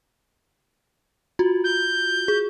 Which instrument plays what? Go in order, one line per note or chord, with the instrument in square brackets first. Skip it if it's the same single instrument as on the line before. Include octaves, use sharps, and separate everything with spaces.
[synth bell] F4 F#4
[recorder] G6
[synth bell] G#4